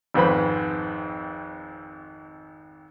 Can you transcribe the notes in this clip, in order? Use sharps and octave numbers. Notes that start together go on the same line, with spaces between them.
G#1 F2 G#2 B4 C5 B5